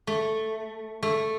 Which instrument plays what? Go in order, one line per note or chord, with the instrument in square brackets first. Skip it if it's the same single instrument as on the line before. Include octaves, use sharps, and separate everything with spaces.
[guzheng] A3
A3